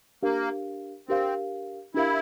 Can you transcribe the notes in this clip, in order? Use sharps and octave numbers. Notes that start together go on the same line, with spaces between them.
A#3 D4 G4 A#4 F5
C4 D4 G4 A#4 F5
D4 E4 G4 A#4 F5